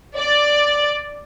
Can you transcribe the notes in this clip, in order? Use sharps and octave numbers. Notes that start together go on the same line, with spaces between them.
D5